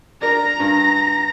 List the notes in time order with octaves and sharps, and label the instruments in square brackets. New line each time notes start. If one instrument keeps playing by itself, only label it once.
[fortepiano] D4 A#4 [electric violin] A#5 A#6
[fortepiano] G2